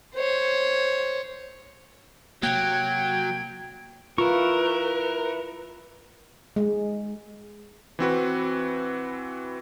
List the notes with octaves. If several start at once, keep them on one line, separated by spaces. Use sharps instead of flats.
C5 C#5
C3 F#3 A#3 G5 G#6
E4 F4 A#4 B4 C#6
G#3
E3 C4 F#4 B4